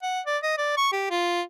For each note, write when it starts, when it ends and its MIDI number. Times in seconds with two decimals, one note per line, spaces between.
0.03 0.21 78
0.26 0.37 74
0.43 0.54 75
0.58 0.76 74
0.77 0.90 85
0.92 1.07 67
1.11 1.42 65